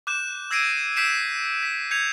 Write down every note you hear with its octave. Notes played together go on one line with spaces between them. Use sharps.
D6 F#6 G6 E7
E6 G#6 A#6 C7 D7 D#7
E6 G6 B6 C7 D7 E7
B6
G6 G#6 C#7 F7